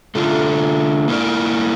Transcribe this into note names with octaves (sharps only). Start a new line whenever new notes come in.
D3 A3 D4 F4
A#3 E4 A#4 D5